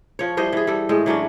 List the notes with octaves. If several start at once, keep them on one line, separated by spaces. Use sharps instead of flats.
F3 C#5
E3 G3 C5 D#5
E3 G#4
G3 A4
A2 G#3
E3 F#3 C#4 D4